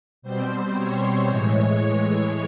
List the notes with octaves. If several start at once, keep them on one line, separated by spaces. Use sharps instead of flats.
B2 G3 C4 C5
C#5
A2 E3 G#3